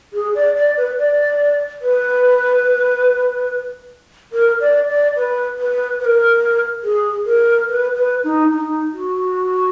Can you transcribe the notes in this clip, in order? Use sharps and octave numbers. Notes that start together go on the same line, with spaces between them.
G#4
D5
D5
B4
D5
B4
A#4
D5
D5
B4
B4
B4
A#4
G#4
A#4
B4
B4
D#4
D#4
F#4